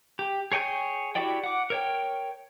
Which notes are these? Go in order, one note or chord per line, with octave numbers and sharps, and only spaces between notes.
G4
G#4 C#5 G5 G#5 G6
E4 F#4 G4 D5 G5
F#5 D6
A#4 C#5 G5